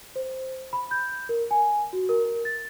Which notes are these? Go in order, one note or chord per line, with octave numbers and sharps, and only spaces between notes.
C5
B5
G6
A#4
G#5
F#4
A#4
A6